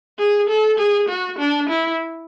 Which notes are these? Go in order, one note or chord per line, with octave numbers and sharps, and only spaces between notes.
G#4
A4
G#4
F#4
D4
E4